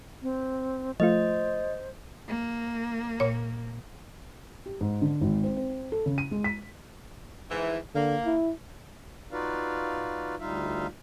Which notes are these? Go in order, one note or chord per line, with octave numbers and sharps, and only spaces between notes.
C4
F3 A3 F4 C5 D#5
A#3
A#2 C#5
G4
G#2
D3
G#1
C4
C4
A4
C#3
D#7
G#3
B6
G#2 E3
D3 A#3
E4
D#4 F4 F#4 B4 D5 F5
D2 G3 D#4 F4 E5 F5